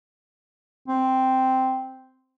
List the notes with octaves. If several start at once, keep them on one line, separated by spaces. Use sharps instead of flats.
C4